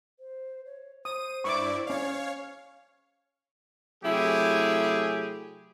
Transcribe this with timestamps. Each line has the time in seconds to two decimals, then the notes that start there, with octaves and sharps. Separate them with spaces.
0.20 C5
0.65 C#5
1.05 C5 D#6 D#7
1.44 G2 E4 D5 C#6 D6
1.87 C#4 C#5 D5 F5
4.04 C3 F#3 A3 E4 G4 G#4